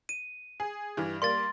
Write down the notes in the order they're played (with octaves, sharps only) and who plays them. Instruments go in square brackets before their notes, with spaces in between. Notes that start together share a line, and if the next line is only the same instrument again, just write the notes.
[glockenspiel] D#7
[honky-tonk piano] G#4
G2 E3
[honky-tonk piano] G3 A#3 [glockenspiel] C6 A6